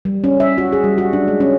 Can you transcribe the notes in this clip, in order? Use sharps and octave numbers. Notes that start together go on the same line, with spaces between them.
G3
C#4
E5
F#4
G#4
G3
F#4
D4
G#3
C#4